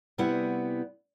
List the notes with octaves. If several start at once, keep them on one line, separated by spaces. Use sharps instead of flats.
C3 G3 B3 C4 E4 F#5